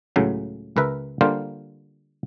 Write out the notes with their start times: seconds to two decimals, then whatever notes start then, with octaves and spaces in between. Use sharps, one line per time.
0.16 C#2 A2 C#3 F#3
0.77 C#2 A#4 B4 E5
1.21 D3 G3 A#3 F4 C5